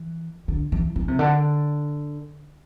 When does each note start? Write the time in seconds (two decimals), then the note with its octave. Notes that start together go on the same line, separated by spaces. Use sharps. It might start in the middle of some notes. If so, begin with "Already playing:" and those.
Already playing: E3
0.48 D3
0.72 E3
0.96 E3
1.08 C3
1.19 D3